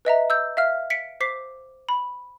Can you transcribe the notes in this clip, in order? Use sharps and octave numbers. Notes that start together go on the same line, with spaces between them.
B4 D#5 E5 A#5
E6 G6
E5 F5 F6
B6 C#7 D7
C5 D6 B6 C7
B5